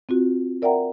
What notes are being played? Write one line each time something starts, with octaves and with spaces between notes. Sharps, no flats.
C4 F4 F#4
A#4 D5 E5 F#5 G5 A#5